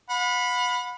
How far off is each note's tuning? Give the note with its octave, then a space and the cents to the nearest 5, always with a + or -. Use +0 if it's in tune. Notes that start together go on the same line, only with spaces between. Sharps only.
F#5 -45 B5 +5